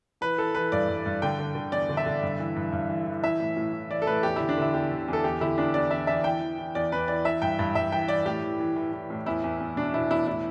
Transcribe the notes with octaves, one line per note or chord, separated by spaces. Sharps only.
E3 B4
E3 A4
E3 B4
G2 D5
G2
G2
D3 G5
D3
D3
E2 D5
D3
E5
D3
G2
E3
G2
G2
E3
E3
E3 E5
A2
A2
E3
E3 D5
A4
A2 B4
E2 G4
D3 E4
D4
D3 E4
E2 G4
D3
E2
A4
E2 G4
D3 E4
E2 D4
E2 D5
E2 E5
E2 E5
E3 G5
E3
E3
E2 D5
E2 B4
E3 D5
E3 E5
G2 G5
G2
G2 E5
E3 G5
E3 D5
A2 G4
E3
E3
E3
E3
A2
E2 E4
E2
E2
B2 D4
B2 E4
E2 E4
A2 E4